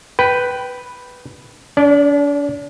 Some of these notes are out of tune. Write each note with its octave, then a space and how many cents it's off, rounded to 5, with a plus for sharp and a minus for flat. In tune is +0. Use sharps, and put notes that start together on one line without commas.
B4 +0 G5 -10
D4 -40 D5 +0